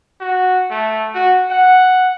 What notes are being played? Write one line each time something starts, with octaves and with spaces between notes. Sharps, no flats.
F#4
A3
F#4
F#5